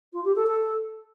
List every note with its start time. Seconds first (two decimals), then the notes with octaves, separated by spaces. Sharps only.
0.13 F4
0.24 G4
0.35 A4
0.47 A4